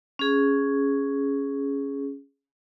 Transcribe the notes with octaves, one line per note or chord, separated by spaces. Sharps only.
C#4 G#4